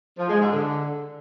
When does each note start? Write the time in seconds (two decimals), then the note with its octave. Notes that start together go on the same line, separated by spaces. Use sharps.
0.18 F3
0.29 G#3
0.40 G#2
0.52 D3